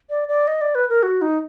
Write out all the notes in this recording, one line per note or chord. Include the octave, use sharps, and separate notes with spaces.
D5
D5
D#5
D5
B4
A#4
F#4
D#4